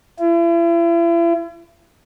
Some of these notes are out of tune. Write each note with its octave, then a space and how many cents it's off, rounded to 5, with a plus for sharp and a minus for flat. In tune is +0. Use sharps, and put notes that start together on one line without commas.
E4 +40